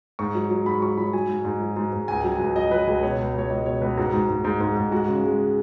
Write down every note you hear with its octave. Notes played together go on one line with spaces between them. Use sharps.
G#2 C#6
F#3
F#3
G#2 B5
F#3 C#6
F#3 B5
F#3 G#5
G#2
G#2
F#3
G#2
G#2
C#2 G#5
F#3
G#5
C#2
F#3 D#5
F#3 B4
C#2 G#4
B2 C#5
C#2
C#2 C#5
C#2 D#5
B2 C#5
C#2 B4
G#2 F#4
G#2
G#2
G#2
G#2
G#2
G#3 F#4
C#3
G#3